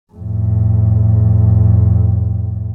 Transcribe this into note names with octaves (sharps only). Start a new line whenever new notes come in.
F2 A2